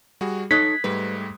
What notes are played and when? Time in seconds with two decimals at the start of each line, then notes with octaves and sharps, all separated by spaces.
0.21 G3 F#4 G#4
0.51 D#4 A4 C#5 D#6 F#6 G#6 B6
0.84 G#2 G3 A3 B4